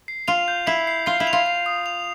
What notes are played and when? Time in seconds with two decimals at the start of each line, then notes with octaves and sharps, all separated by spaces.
0.08 C7
0.28 F4 F7
0.48 G6
0.67 E4 C7
0.87 C7
1.06 F4 C7
1.20 E4
1.27 F7
1.33 F4
1.46 F7
1.66 D#6
1.86 F7